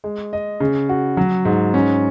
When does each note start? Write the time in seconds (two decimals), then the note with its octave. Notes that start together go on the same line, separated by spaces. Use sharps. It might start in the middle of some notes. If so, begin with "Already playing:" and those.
0.04 G#3
0.33 D#5
0.60 C#3
0.89 F#4
1.17 F#3
1.45 G#2
1.74 C#4